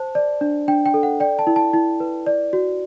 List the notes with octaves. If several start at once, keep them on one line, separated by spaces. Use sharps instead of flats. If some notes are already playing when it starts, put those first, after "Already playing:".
Already playing: C5 A5
D5
D4
D4 G5
G5
A4
F#5
D5 G5
A5
E4
A5
E4
B4
D5
F#4